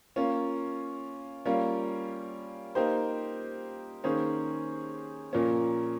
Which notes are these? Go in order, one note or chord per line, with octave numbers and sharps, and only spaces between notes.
A#3 C#4 F4
G3 A#3 C#4 F4
A#3 D#4 G4 C5
D#3 A#3 C#4 G#4 C5
A#2 F3 A#3 C#4